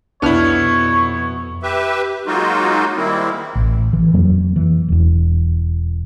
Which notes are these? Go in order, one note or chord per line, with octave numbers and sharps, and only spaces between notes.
C2 F2 B2 B3 D4 E4 C#5 F6
G4 B4 E5
F#3 G#3 A#3 D#4 F4 F#4
D#3 G3 G#3 A#3 C4 E4
A1
E3
F2 F#3 A#3
E3
E1 E2